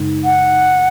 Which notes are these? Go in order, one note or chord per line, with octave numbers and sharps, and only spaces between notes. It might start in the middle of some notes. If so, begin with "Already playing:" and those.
Already playing: F#2 C#3 G#3 D#4
F#5